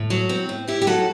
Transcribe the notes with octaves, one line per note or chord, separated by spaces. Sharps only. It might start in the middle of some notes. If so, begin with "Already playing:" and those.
Already playing: A2
F#3
C4
A2
A2 E4 G4
G4
F#3 F#4 A4